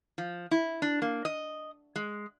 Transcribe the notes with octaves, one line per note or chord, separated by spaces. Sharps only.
F3
E4
D4
A#3
D#5
G#3